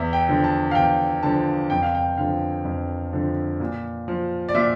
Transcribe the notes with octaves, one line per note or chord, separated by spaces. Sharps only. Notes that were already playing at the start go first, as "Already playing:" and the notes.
Already playing: E2 E5
G5
D3 F3
A5
F5
E2 G5
D3 F3 A5
F2 G5
F5
G5
D3 F3 F5
F2
D3 F3
A#2
F3
D5
A#2 E5